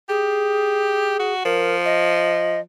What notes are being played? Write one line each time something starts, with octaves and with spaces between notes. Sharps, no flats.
G4 G#4
F#4
F3 A#4
D#5